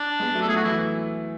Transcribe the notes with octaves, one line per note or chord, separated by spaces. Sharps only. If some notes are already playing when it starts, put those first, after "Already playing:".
Already playing: D4
G#3 B3
F#3 A3
A4
F#3 A3 G#4
F#4
E3 E4